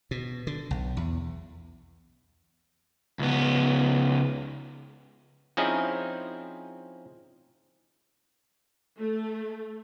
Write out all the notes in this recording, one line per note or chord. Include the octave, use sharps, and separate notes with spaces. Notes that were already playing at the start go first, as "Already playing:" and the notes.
B2
D3
B1
E2
C#2 B3
F3 C4 C#4 D#4 E4 G#4
A3